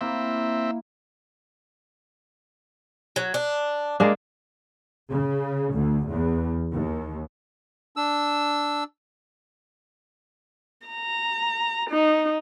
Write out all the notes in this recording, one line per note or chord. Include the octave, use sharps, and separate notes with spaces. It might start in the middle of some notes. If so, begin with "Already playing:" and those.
A#3 C4 E4 E5
F#3
D4
G#3 A#3 D4
C#3
D2
E2
D#2
D4 E6
A#5
D#4